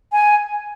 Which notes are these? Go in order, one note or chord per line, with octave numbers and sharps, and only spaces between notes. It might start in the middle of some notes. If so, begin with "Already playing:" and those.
G#5